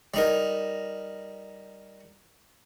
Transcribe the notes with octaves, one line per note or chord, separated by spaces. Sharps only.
G3 D#4 A#4